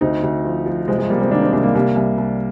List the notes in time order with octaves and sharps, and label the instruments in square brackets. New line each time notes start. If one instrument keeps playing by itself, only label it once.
[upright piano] D2 C4 D#4
D2
F3
F3
C2 G#3 C4
F3 G#3
C3 G3 A#3
G#3 C4
D#3 A#3 D4
C4 D#4
C2 A#3 D4
G3 A#3
C2 G3 A#3
C2
C2